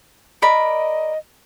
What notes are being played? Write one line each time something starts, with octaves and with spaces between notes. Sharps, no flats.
A#4 D5 D#5 B5